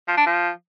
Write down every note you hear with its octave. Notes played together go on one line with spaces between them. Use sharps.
F3
D4
F3